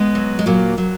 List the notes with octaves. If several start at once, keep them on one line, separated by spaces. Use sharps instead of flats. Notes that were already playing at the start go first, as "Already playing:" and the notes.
Already playing: G#3 B3
F#3
G#3
A#2 F#3 A#3
A#2 F#3